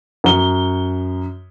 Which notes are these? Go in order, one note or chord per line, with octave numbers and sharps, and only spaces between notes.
F#2 G7